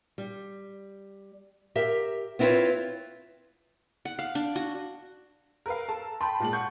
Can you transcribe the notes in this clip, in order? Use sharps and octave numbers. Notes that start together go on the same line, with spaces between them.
G3
G4 A#4 E5
B3 C4 E4 F4 B4 C#5
F#5
F5
D4
F#4
A#4 B4 F5
A4 A5
G5 A5 B5 C6
A#2 G#3 F#7
F#5 C#6 G6